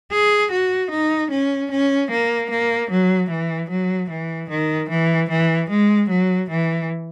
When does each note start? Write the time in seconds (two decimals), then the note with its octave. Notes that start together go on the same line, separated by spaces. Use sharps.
0.12 G#4
0.51 F#4
0.91 D#4
1.31 C#4
1.71 C#4
2.11 A#3
2.50 A#3
2.90 F#3
3.30 E3
3.70 F#3
4.10 E3
4.50 D#3
4.90 E3
5.29 E3
5.70 G#3
6.09 F#3
6.50 E3